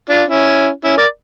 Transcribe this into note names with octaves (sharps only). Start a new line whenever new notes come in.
D4 F4
C#4 E4
C#4 E4
A#4 D5